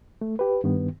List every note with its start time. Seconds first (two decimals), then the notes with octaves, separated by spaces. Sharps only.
0.21 A3
0.39 G4 B4
0.64 G2 D#3 B3